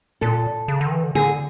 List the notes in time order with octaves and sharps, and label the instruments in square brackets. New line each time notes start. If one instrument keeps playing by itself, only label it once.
[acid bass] A#2 [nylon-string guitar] A4
[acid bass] C#3
D3
D#3
E3
D3
[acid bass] D3 [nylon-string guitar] G#4